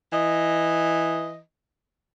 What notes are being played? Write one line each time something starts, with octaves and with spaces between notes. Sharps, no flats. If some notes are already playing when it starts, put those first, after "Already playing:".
E3 D#5